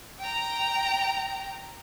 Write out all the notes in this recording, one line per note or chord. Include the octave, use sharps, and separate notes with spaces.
G5 A#5